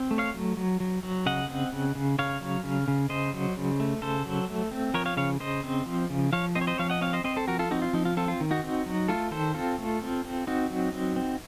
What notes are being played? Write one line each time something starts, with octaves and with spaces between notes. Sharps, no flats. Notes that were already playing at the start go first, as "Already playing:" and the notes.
Already playing: C4
A3
C#5 F5
F#3
F#3
F#3
F#3
C#3 D#5 F#5
C4
C#3
C#3
C#3 C#5 F5
F#3
C#3
C#3
C#3 C5 D#5
F#3
C#3
A3
C#3 A4 C5
F#3
A3
C4
F3 A#4 C#5
C#5 F5
C#3 C#5 F5
C#3 C5 D#5
C4
F3
C#3
F3 C#5 F5
C4 C5 D#5
C#5
C5 D#5
F3 C#5 F5
D#5 F#5
C4 C#5 F5
C5 D#5
C4 C5 D#5
A4 C5
F3 F#4 A#4
F4 A4
C4 D#4 F#4
F4
F3 D#4
F4
C4 F4 A4
F4
D#3
D#4 F#4
C4
F#3
A3 F4 A4
D#3 A4 C5
C4 F4 A4
A3
C4
C4
C4 D#4 F#4
F#3
C4
C4